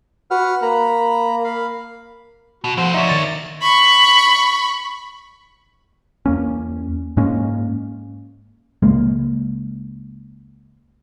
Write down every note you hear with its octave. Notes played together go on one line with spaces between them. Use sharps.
F#4 B4 F#5 F6
A#3 A#5 B5
F5 B5
B2 F#4
F3 A3 C5 F#5
D#4 C#5 D5 E5
D#3 A6 A#6
B5 C#6
E2 A#3 C#4
G#2 G#3 A#3 C#4
C#2 G#3 A#3